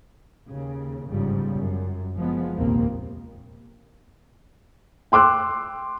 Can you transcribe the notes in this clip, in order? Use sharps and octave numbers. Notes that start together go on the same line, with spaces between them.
D#2 C#3
G1 G#2 C#3 F3 G3
F#2
F#1 F3 G#3 B3
F1 A#1 D#2 D#3 A#3 C4
G5 C6 D6 E6 F#6